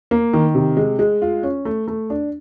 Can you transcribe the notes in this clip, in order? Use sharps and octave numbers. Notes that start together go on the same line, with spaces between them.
A#3
D#3
C3
G#3
G#3
F4
C#4
A3
A3
D4